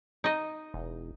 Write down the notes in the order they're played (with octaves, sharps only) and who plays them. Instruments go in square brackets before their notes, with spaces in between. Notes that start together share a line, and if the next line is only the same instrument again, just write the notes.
[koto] D#4 D#5
[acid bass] E1